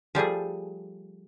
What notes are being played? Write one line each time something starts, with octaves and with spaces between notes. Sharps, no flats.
F3 G3 A3 G#4